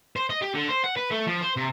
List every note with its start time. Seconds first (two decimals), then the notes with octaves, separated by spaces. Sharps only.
0.16 C5
0.30 D#5
0.42 G4
0.54 D3
0.69 C5
0.84 F#5
0.96 B4
1.11 A3
1.27 F3
1.42 C5
1.57 C3